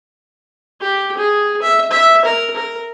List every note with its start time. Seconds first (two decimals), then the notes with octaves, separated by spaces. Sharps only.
0.81 G4
1.17 G#4
1.62 E5
1.91 E5
2.25 A#4
2.56 A#4